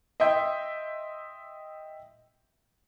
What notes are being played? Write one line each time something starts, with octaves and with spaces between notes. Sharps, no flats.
D#5 E5 G5 C6 G6